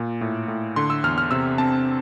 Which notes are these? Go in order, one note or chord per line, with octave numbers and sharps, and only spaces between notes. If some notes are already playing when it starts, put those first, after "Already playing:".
Already playing: A#2
A2
A2
D3 C6
E6
E2 F6
F6
C3 E6
C4 A5